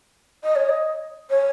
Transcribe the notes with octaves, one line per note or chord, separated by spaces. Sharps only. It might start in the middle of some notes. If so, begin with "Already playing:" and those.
D#5
C#5
D#5
C#5